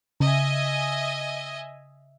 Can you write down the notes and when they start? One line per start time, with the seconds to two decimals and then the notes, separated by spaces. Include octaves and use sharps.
0.20 C#3 D#5 E5 G#5